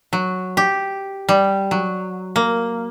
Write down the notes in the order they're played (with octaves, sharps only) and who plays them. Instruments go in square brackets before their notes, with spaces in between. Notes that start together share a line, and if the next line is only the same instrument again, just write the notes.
[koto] F#3
G4
G3
F#3
A#3